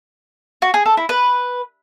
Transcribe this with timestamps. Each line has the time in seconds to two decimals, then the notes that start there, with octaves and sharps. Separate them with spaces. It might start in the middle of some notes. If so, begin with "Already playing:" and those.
0.62 F#4
0.74 G#4
0.86 A4
0.97 E4
1.09 B4